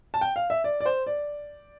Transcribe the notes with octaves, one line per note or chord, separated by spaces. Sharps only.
A5
G5
F5
E5
D5
D5
C5
D5